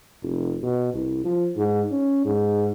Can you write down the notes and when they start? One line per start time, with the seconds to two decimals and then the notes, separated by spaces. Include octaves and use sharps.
0.22 F1
0.63 B2
0.94 C2
1.24 F3
1.57 G#2
1.92 C#4
2.25 G#2